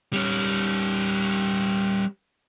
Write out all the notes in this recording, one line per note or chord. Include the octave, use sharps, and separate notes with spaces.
G3 C#4